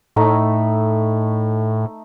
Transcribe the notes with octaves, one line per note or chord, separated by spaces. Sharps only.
A2 A3 D#4 E5